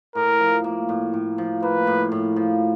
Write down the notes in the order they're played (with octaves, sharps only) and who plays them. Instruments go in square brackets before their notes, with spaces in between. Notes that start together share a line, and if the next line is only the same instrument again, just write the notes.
[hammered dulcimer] A2 [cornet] A#4
[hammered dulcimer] F3
A#3
A2
A2
F3
[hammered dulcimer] A#3 [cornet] B4
[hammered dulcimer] A2
A2
F3